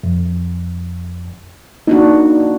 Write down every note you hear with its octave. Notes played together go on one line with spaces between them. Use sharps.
F2
A#3 D4 D#4 F#4